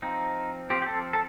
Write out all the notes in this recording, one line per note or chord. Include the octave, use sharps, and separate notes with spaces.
F3 C4 D#4
F3 C4 G4
G4
A4
A4